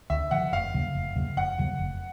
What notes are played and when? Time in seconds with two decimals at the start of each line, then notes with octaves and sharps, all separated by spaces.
0.10 D2 E5
0.31 D3 F3 F#5
0.52 F1 F5
0.74 D#2 C#3 F#3
0.95 F1
1.16 D#2 C#3 F#3
1.36 F1 F#5
1.58 D#2 C#3 F#3
1.79 F1